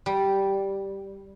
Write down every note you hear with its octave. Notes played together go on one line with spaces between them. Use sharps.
G3